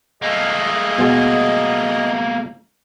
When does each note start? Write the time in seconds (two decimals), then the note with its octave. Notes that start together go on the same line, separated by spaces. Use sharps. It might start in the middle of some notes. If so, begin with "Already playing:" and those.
0.22 A3 A#3 G#4 D#5
0.98 B2 G#3